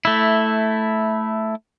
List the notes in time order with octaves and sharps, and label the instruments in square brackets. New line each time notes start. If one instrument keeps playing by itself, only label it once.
[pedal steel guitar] A3 E4